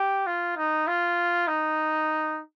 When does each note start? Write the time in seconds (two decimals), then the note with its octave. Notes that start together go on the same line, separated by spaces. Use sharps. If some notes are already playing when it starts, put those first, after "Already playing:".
Already playing: G4
0.27 F4
0.57 D#4
0.87 F4
1.47 D#4